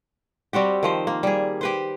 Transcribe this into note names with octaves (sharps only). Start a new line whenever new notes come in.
G3 C4 F#4 G4
D#3 F3 C5
A#3
G3 G#4
G4 B4 C5